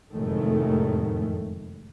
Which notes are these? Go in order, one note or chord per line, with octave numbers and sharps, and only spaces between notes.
F1 F#2 A2 D#3 G#3 A3